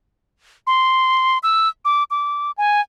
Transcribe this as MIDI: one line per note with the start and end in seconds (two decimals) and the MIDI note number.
0.67 1.38 84
1.43 1.69 88
1.85 2.03 86
2.10 2.51 86
2.57 2.81 80